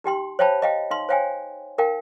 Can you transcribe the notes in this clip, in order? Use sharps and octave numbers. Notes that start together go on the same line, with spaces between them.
D#4 G4 G5 C6
C5 C#5 F5 G5 A5 B5
D#5 F5 G5
D#4 F5 C6
C5 C#5 F5 G5 G#5
D#4 A#4 F5 G5